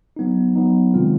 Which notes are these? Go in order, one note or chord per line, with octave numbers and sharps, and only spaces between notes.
F#3 B3 D#4
F#3 B3 D#4
C3 D#3 G#3 C4 F4